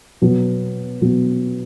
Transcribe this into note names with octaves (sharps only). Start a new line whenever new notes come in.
B2 F#3 B3
B2 F#3 B3